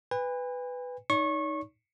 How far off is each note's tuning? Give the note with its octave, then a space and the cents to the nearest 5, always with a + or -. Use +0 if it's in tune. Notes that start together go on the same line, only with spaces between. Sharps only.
B4 +10 G#5 -45
D#4 +0 C#5 +40 C#6 -25